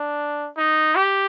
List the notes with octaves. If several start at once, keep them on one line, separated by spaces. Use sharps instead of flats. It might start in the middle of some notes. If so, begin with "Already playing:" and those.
Already playing: D4
D#4
G4